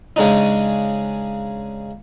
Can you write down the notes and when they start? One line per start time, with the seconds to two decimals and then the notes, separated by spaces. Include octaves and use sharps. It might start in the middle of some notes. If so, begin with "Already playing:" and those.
0.16 C#3 G#3 D4 D#4